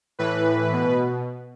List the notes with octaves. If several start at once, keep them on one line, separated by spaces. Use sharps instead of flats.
A2 E3 B4
B2